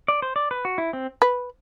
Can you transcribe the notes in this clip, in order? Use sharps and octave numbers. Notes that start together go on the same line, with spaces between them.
D5
C5
D5
B4
F#4
E4
C4
B4